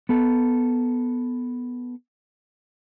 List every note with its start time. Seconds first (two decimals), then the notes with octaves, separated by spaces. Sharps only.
0.09 B3 A4